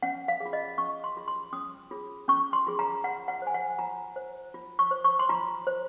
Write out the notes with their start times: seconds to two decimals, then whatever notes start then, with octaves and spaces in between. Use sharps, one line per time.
0.03 C#4 F#5
0.28 F5
0.40 G#4
0.46 F4
0.53 D#5
0.78 C#4 C#6
1.04 C6
1.16 F4 G#4
1.28 C6
1.53 C#4 D#6
1.91 F4 G#4
2.28 C#4 C#6
2.53 C6
2.66 F4 G#4
2.79 A#5
3.04 F4 F#5
3.28 F#5
3.42 C5 G#5
3.54 F#5
3.79 F4 A#5
4.16 C5
4.54 F4
4.79 C#6
4.91 C5
5.04 C#6
5.19 C6
5.29 F4 A#5
5.67 C5